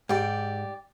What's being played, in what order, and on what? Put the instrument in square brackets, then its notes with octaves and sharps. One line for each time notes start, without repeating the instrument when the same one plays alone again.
[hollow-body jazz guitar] G#2 [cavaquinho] G4 D5